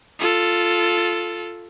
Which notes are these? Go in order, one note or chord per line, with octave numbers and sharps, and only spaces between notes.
F4 A4